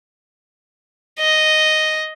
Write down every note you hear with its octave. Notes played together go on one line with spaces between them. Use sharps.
D#5